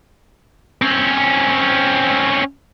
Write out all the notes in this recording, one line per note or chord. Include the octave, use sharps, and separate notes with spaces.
C4 C#4